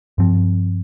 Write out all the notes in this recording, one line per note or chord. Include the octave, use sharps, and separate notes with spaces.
G2 F3 C4